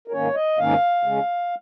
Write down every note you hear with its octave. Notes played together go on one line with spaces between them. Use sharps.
A#4
G#2 D#3 A#3 C#4 C#5
D#5
G#2 D#3 A#3 C#4 F5
C#3 G#3 C#4